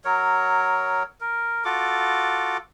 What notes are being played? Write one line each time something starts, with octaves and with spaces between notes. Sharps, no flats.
F#3 A#4 C#5
A#4
F4 F#4 A4 D6